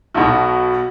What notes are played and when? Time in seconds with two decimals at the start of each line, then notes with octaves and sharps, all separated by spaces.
0.14 B1 B2 F#4